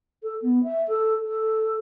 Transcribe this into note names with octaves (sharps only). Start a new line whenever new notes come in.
A4
B3
E5
A4
A4